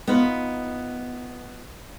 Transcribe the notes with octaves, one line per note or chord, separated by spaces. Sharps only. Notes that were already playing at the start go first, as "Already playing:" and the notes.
B3 D#4 F4 B4